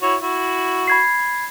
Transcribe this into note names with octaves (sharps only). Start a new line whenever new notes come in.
E4 F#4 C#5
E4 F#4
B5 G#6 C7